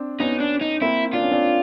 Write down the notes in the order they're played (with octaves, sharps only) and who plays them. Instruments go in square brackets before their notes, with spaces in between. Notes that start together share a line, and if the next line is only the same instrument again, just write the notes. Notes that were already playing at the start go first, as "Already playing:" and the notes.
Already playing: [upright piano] C4 D4
[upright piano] B3 C#4 [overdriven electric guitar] D#4
[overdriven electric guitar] D4
D#4
[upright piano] A#3 C4 [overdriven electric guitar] E4
[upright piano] D4 [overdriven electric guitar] F4
[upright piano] C#4
C4 D4